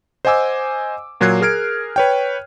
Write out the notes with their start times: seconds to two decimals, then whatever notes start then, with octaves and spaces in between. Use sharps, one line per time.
0.25 C5 D#5 F#5 G#5 D6 E6
1.21 A#2 F#3 A#4 F#6 G#6 C7
1.41 G#4 A#4 F6 G#6 D7
1.96 B4 C#5 G5